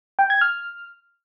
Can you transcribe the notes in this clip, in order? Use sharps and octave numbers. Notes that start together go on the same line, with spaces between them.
G5
G#6
F6